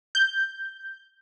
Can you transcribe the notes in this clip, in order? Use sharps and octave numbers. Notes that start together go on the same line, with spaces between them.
G6